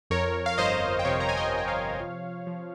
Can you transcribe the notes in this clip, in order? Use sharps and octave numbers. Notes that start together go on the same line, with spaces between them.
F2 A#4 C#5
F5
G1 C5 D#5
G5
C3 C#5 F5
A#5
G#5
D#5 G5
C3 G5
C#5 F5
F3
F3